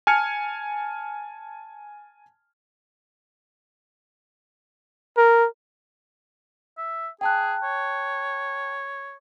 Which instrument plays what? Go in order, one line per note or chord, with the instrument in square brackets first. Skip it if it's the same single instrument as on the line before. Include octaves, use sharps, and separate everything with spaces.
[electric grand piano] G#5 A5 F6 G#6 C#7
[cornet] A#4
[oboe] E5
[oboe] G#4 [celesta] G5 A5 F#6
[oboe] C#5